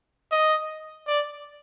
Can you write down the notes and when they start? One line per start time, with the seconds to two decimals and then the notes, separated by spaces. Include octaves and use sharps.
0.31 D#5
1.08 D5